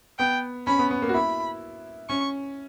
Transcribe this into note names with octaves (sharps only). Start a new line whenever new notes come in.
B3 G5
C#4 B5
B3
B3
A#3
F#4
E4 B5
C#4 C#6